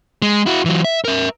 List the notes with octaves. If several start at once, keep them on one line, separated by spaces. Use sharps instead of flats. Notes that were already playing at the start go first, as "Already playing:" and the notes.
G#3
E4 F#4
E3 F#3
E5
A#4 E5